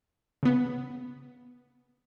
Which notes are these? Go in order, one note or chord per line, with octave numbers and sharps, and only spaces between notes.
C#3 B3